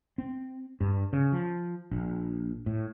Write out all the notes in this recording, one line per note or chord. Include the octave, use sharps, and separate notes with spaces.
C4
G2
C#3
F3
A#1
A2